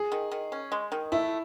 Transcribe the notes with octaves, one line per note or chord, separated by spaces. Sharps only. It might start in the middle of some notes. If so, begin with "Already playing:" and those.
Already playing: G#4
D#3
D#3
C#4
G#3
D#3
A3 E4